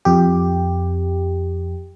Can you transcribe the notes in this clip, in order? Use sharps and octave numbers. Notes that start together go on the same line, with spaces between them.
F2 G4